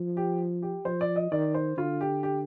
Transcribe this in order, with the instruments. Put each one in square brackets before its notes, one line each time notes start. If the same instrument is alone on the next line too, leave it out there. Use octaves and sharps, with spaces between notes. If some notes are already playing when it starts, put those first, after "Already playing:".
Already playing: [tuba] F3
[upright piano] G4
G4
[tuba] F3 [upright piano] C5
[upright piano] D5
D#5
[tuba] D#3 [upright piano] D5
[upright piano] C5
[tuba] D3 [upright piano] F4
[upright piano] G4
G4